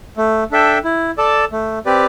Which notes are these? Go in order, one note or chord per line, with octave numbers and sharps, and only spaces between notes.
A3
D4 A4 E5 G5
E4
A4 D5 A5
A3
C4 G4 B4 D5